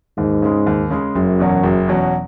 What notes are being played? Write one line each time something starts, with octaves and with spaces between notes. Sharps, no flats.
D#2 G#2
C#3 G#3
D#2
C#3 G#3
F#1 F#2
E2 B2 F#3 C#4
F#1
E2 B2 F#3 C#4